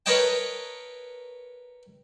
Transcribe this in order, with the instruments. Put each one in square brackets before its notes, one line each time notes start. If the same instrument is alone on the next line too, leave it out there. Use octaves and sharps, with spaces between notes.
[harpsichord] A#4 B4 C#5 D#5 G5 A5